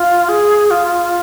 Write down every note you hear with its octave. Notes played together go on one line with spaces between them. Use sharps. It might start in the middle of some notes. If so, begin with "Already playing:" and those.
Already playing: F4
G#4
F4